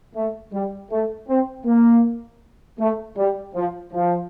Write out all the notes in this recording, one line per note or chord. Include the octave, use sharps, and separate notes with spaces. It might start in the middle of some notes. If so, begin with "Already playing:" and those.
A3
G3
A3
C4
A#3
A3
G3
F3
F3